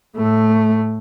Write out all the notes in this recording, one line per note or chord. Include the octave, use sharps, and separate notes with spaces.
A2 A3